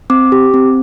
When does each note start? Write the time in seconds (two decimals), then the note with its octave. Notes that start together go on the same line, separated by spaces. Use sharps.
0.10 C4 D6
0.32 G4
0.54 C4